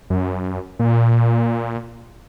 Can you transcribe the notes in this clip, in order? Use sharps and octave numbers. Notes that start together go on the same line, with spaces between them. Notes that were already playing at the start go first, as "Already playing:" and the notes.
F#2
A#2